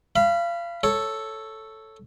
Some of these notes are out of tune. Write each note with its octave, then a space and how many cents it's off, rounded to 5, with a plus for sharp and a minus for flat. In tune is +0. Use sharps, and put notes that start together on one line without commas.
F5 -30 B5 +0
A4 +0 C#5 +0